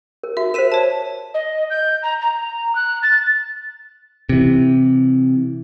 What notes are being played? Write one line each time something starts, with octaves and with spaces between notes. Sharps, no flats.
A#4
F#4 E5
A#4 C5 B6 D#7 E7
C#5 A5
D#5
G6
A#5
A#5
F#6
A6
C3 E3